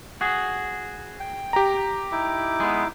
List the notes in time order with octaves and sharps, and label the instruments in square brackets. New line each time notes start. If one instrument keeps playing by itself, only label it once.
[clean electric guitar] F#4 G#4
[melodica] G5
[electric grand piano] G4 A#5
[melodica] D#4 E4 D6
[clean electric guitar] G#3 B3